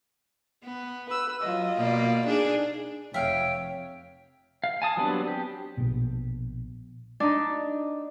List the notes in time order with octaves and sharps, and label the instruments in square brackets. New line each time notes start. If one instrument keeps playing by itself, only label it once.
[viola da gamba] B3
[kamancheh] B4 E6
[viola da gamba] F#3 [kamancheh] F4 D#5
[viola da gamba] B2 A#3 D5
[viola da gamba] D4 D#4 G#4 [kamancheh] D5
[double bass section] F1 [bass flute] C#5 [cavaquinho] E5 F5 [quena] G5
[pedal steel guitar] F5
G#5 A5 D#6
F#3 G3 B3 C4 D4
G4
[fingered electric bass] A#1 B2
[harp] D4 D#4